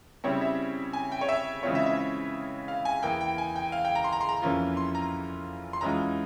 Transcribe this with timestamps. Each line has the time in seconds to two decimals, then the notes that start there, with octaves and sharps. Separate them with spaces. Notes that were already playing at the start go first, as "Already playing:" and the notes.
0.24 C#3 G3 C4 E4 C#5
0.41 E5
0.93 G#5
1.12 G5
1.21 C#5
1.29 E5
1.63 C#3 E3 G#3 C4 F4 C#5
1.75 E5
1.86 E5
2.68 F5
2.85 G#5
3.03 E2 E3 A#3 G5
3.21 G5
3.38 G#5
3.56 G5
3.72 F5
3.85 G5
3.95 A#5
4.04 C6
4.13 A#5
4.21 C6
4.29 A#5
4.42 F2 E3 A#3 C#4 F4 A#5
4.77 C6
4.95 A#5
5.73 C6
5.81 E2 E3 G#3 C#4 F4 A#5